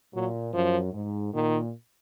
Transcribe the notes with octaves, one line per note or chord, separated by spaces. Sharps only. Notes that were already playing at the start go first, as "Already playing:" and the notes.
A#2 F#3
F#2 F3
G#2
A#2 D#3